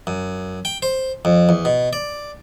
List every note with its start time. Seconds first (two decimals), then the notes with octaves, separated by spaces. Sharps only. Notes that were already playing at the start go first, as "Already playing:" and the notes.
0.07 F#2
0.65 G5
0.82 C5
1.25 F2
1.49 E2
1.65 B2
1.93 D5